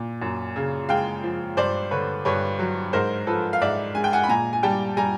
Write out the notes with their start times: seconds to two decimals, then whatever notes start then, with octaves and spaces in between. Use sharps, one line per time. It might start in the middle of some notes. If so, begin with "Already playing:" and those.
Already playing: A#2
0.22 F#2
0.56 C#3
0.89 G#3 F5 G5
1.24 F3
1.57 G2 C5 D5
1.91 D3 B4 C#5
2.25 G2 B4 C#5
2.59 F#3
2.93 G#2 A#4 C5
3.27 F3 A4 B4
3.53 F5
3.62 G#2 D5 E5
3.95 G#3 G#5
4.04 G5
4.13 F#5 G#5
4.24 B5
4.29 A#2 G#5 A#5
4.53 G#5
4.63 G3 G5 A5
4.97 G3 G#5 A#5